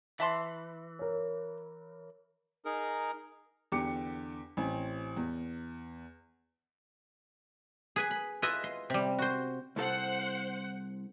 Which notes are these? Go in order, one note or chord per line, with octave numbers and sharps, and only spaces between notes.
E3 E5 A5 C6
A#4 C#5
D#4 G#4 A#4
E2 D3 G4 D6 C#7
A1 C4 G#5
E2
G#4 B4 G#5
B5
E4 F4 B4 D#5 E5
C6
C3 G3
F#4 C5
C2 A4 C5 F#5